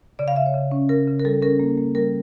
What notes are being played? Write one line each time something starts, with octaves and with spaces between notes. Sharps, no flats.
C#3 D5
F5
C#3 E5
C#5
C#3
C#4
C#3 A#4
C#3
A#4
G3 A4
C#4 A#4
A#3
A#3
G3 A#4